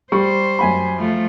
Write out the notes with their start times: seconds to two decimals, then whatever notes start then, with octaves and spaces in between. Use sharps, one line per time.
0.12 G3 C5 C#6
0.59 F#2 G#5 B5
0.97 F3 A3